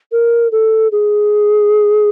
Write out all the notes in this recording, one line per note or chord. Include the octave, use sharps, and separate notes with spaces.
A#4
A4
G#4